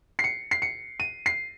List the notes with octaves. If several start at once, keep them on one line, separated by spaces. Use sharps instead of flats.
C7
C#7
C7
C#7
D#7
C7